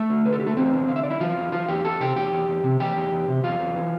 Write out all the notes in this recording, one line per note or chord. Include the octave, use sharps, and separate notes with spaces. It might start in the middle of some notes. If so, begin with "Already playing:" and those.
Already playing: A3 A4
D3
D3 B4
A4
D3 G4
A3 A4
E2 C4 C5
D3
D3 F5
E5
D3 D5
E4 E5
E3 F4 F5
E2
E3 F4 F5
E2 G4 G5
E2 A4 A5
C3 G4 G5
E2 G4 G5
E2
E2
C3
E3 G4 G5
E2
E2
C3
E2 F4 F5
E2
E3